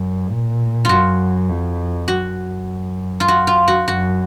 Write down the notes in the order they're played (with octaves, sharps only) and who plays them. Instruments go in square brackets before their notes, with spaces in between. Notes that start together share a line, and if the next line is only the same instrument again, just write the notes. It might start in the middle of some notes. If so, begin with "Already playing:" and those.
Already playing: [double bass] F#2
A#2
[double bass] F#2 [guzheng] F4 F#4
[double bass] F2
[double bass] F#2 [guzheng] F#4
[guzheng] F4
F#4
F4
F#4
[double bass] F#2 [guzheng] F#4